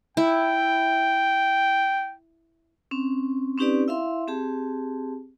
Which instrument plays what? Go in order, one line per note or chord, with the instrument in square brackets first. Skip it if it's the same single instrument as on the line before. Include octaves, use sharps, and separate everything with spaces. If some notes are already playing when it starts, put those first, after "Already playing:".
[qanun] E4 [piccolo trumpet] G5
[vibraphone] C4 C#4
C4 C#4 D#4 G4 B4 D5
E4 E5 F5 C6
C4 G4 G#4 A5